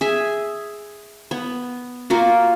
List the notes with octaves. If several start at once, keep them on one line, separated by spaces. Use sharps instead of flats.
G#4 E5
B3
A#3 F4 F#4